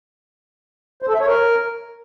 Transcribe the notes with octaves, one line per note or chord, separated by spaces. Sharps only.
C5
A4
E5
C#5
A#4